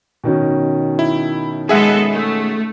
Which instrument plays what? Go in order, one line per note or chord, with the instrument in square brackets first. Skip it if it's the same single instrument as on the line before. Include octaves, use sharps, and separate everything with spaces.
[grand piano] B2 D#3 C#4
[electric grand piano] E4
[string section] G#3 B3 A4 [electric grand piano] G#4 E5 F#5
[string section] A3